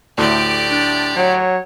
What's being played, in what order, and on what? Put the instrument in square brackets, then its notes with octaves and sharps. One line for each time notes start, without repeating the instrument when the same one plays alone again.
[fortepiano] D2 A2 [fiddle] G4 D5
[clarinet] D4
[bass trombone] F#3 [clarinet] C#5